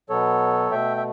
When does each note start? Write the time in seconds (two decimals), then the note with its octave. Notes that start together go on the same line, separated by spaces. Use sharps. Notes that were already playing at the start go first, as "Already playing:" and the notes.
0.09 B2 F#3 B3 A4 C#5
0.71 B2 A3 E5 G5
0.97 E5